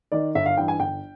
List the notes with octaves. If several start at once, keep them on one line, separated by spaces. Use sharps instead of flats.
D#3 D5
G1 E5
F5
G2 E3 G5
G#5
G1 G5